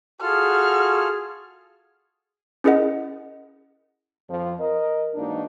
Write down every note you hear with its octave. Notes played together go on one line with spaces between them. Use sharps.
F4 F#4 G#4 A4 F6
C#4 E4 G#4 A#4 D#5 F#5
F2 F3
A#4 D#5
G#2 E3 A#3 D4 D#4 F#4